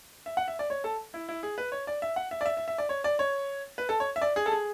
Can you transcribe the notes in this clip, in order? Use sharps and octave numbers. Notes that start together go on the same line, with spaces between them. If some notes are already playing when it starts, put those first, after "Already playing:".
E5
F#5
E5
D5
C#5
A4
E4
E4
G#4
B4
C#5
D5
E5
F#5
E5
D5
E5
E5
E5
D5
C#5
D5
C#5
B4
A4
C#5
E5
D5
G#4
A4
G#4